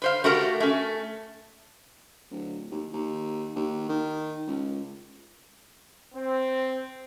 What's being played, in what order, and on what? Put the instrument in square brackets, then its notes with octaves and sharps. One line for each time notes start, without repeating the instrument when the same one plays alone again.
[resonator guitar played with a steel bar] B4 C5 F5
A3 F#4 G4 A#4
A3 C#4
[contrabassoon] D1
D#2
D#2
D#2
D#3
C#2
[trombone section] C4